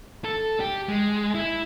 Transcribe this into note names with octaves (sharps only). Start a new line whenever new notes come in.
A4
G4
G#3
E4